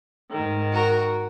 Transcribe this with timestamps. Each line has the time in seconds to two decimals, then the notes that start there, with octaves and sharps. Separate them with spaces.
0.31 G#2 D#3
0.74 F#4 A#4